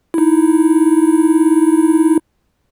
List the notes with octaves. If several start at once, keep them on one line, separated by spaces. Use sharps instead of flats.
D#4 E4